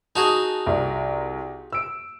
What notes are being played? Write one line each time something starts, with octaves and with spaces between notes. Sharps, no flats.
D#4 F#4 G#4 A5
C2 A#5
E6 D7